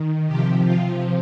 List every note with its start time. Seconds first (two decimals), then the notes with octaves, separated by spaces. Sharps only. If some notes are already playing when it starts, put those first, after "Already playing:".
Already playing: D#3
0.27 C3 F3 G4
0.64 F4